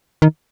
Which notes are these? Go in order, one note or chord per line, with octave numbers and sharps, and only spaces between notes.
D#3